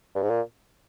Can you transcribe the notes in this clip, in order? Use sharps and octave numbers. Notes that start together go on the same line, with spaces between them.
G2
G#2
A#2